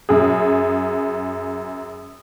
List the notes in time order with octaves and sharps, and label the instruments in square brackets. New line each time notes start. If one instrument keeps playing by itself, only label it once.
[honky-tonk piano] F#2 G#4